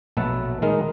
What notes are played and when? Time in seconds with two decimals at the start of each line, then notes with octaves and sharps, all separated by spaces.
0.17 A#1 B2 F#3 A3 A4 B4
0.62 D#3 G#3 D#4 A#4 D#5